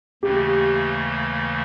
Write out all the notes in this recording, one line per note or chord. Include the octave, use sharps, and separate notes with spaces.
D#2 C#3 E3 A3 G4